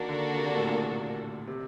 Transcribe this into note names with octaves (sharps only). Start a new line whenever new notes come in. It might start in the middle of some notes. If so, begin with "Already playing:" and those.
Already playing: D#3 A#3 D4 F#4 A4
D3
C3
A2
A#2
C3